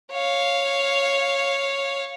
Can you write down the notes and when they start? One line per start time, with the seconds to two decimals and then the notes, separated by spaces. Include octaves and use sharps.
0.11 C#5 F5